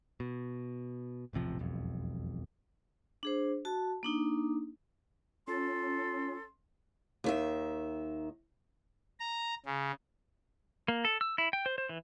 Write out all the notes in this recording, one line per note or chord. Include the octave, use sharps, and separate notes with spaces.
B2
E1 A1 C3 F3
E1 B1 F2
D4 G#4 C5
F#4 A5
A#3 D4 D#4
C#4 F4 A4 C6
D#2 D#3 E5
A#5
C#3
A#3
A4
E6
E4
G5
C5
C5
E3